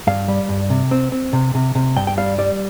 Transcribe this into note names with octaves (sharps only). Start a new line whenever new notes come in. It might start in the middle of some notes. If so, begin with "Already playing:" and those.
G2 F5
G3
G2
C3
C4
C4
C3
C3
C3
G2 G5
G5
G3 F5
G3 D5